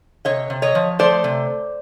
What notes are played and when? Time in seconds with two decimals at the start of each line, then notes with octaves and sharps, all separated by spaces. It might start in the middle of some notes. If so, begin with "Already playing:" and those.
0.25 C3 C#5 D#5
0.50 C3
0.62 C#5 D#5
0.75 F3
0.99 A3 C5 D5
1.24 C3